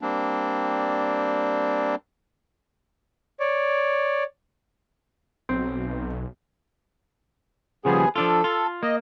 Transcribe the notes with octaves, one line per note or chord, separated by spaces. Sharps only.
G3 A#3 C4 D4
C#5 D5
B1 C4
D#2 C#3 F3 G3 B3 G#4
F3 D4 F4 A4
F4
A#3 D#5